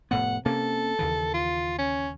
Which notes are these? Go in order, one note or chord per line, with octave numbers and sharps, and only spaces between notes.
F1 A2 B3 F#5
C3 A#3 C#4 A4
D#2 C#3 E3
F4
C#4